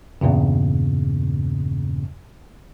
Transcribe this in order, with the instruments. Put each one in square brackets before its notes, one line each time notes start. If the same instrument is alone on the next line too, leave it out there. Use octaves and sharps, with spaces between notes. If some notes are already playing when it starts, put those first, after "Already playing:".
[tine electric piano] E2 G2 A#2 C#3